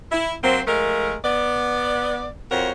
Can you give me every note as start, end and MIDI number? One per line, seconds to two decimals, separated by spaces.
0.12 0.36 64
0.43 0.61 54
0.43 0.61 58
0.43 0.61 60
0.68 1.16 53
0.68 1.16 56
0.68 1.16 57
0.68 1.16 70
1.25 2.27 59
1.25 2.27 74
2.52 2.72 41
2.52 2.72 66
2.52 2.72 70
2.52 2.72 72
2.52 2.72 73